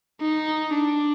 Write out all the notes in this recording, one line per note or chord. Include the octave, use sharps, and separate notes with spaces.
D#4
D4